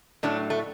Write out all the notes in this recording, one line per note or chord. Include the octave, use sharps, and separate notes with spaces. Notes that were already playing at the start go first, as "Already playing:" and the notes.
A2 F#3 A3 D4
A3